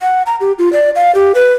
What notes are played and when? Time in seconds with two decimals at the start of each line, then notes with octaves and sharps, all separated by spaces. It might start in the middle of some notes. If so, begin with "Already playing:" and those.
0.02 F#5
0.26 A#5
0.40 G4
0.58 F4
0.73 D5
0.96 F5
1.15 G4
1.35 B4